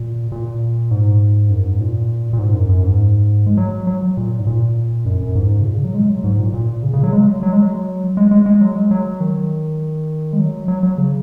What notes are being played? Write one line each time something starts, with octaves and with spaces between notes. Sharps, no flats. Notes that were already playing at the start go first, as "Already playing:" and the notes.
Already playing: A#2
A#2
G#2
F#2
G#2
A#2
A#2
G#2
F#2
F#2
G#2
G#3
F#3
F#3
A#2
G#2
A#2
F#2
F#2
G#2
C#3
A#2
C#3
F#3
G#3
F#3
G#2
A#2
A#2
C#3
C#3
F#3
G#3
F#3
F#3
G#3
F#3
G#3
G#3
G#3
F#3
G#3
F#3
D#3
G#3
F#3
F#3
F#3
C#3